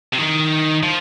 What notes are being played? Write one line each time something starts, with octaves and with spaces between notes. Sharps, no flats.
C3
D#3
F3